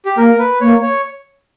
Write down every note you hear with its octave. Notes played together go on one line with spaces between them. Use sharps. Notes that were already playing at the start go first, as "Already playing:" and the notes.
G4
A#3 A#4
B4
A#3 C#5
C#5